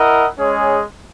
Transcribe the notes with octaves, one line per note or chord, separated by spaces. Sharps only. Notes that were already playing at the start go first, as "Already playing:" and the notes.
Already playing: E4 A#4 D#5 F#5
G#3 C#4 G#4 C#5